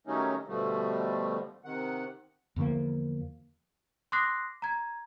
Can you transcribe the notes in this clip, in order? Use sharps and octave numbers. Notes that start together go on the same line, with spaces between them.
D#3 F#3 G3 A3 C#4 D#4
B2 D3 F3 G3 A3
C3 D#3 F#5
E2 D3 F3 A#3
C6 D6 D#6 F#6 A#6 C7
A#5 G#6